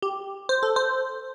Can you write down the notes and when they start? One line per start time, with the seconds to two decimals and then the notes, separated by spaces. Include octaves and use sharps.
0.02 G4
0.49 C5
0.63 A4
0.76 C5